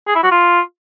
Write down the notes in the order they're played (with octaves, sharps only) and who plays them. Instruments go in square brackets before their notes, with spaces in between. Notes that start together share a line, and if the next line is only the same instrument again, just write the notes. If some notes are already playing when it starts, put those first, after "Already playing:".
[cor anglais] G#4
E4
F#4
F4